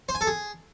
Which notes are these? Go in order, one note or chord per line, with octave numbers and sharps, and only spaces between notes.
C5
G#5
A4
G#4